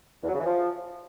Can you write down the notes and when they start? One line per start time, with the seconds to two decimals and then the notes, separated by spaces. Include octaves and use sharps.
0.23 E2
0.29 F#3
0.34 C#3
0.40 E3
0.46 F3